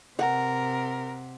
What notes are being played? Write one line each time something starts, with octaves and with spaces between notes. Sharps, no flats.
C3 A#4 F#5